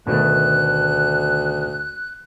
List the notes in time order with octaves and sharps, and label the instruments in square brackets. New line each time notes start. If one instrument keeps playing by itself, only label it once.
[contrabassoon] D2 [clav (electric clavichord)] B2 D#3 A3 [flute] F#6